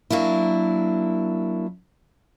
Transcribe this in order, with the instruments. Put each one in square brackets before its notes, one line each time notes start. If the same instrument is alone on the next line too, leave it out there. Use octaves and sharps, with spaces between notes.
[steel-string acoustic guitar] F#3 A#3 D4 E4